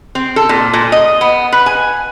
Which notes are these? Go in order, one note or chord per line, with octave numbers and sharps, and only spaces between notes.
C4
A4
A#2
A#2
D#5
B3
B4
G#5